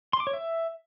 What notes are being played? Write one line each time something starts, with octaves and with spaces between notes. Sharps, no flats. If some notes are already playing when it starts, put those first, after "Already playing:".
C6
D6
C#5
E5